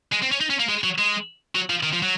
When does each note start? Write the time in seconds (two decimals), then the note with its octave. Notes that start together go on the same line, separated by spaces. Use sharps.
0.12 G#3
0.22 C4
0.31 C#4
0.41 D#4
0.50 C#4
0.60 A#3
0.69 G#3
0.84 F#3
0.98 G#3
1.55 F#3
1.70 F3
1.83 D#3
1.93 F3
2.02 F#3